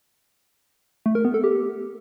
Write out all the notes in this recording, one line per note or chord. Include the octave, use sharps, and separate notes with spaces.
A3
A#4
B3
A4
G4